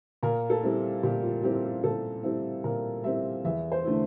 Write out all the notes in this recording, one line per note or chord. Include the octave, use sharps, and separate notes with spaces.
A#2 A#4
A4
G3 C4 E4
A#2 G4
F4
G3 C4 E4 G4
G4
A#2 A4
G3 C4 E4
A#2 A#4
G3 C4 E4 E5
E2 E5
C5
D3 A3 E4